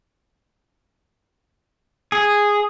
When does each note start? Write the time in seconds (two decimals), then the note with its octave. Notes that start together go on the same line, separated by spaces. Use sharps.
2.12 G#4